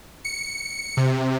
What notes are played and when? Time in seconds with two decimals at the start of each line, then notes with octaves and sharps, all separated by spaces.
0.25 C#7
0.97 C3